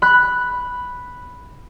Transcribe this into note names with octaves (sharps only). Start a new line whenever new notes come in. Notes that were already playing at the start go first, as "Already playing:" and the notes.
B5 F#6